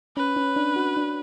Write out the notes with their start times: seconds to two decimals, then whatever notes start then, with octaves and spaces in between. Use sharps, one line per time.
0.17 C#4 B4
0.36 C#4
0.56 D4
0.76 F#4
0.97 D4